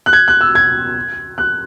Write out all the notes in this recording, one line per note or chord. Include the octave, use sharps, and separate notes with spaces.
F#6
G#6
F#6
E6
G#6
F#6